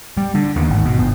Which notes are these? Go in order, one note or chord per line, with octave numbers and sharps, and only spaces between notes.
G3
D3
D#2
G#1
B2
G1